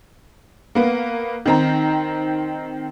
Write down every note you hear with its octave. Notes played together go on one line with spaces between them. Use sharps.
A#3 B3
D#3 C4 A#5